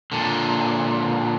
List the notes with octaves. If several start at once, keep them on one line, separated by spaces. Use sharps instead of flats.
A#2 D3